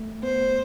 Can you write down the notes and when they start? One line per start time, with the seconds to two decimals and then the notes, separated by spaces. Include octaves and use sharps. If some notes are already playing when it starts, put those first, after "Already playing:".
Already playing: A3
0.23 B3 C5